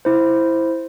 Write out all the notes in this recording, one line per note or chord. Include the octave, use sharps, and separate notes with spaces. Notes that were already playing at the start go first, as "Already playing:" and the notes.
E4 C5